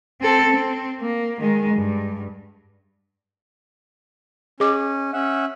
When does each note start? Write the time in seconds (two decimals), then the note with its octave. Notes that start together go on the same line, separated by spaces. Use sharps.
0.21 C4 A4
0.51 C4
1.00 A#3
1.41 D#3 G#3
1.74 G2
4.60 C#4 G#4 D#5 D6
5.13 C#4 E5 F#5